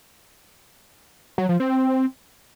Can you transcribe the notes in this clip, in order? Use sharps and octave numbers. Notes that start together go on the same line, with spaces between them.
F#3
F3
C4